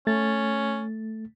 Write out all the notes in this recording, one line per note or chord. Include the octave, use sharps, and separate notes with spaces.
A3 C#4 A6